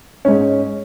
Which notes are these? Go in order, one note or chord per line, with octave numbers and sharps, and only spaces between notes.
G#2 C#4